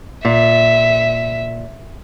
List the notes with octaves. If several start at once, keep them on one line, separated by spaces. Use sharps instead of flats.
A#2 E5